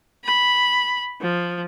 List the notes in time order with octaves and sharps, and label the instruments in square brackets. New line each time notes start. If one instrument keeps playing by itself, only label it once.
[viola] B5
F3